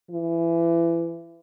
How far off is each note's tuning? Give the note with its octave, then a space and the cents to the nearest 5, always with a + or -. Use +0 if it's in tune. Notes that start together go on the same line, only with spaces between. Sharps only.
E3 +25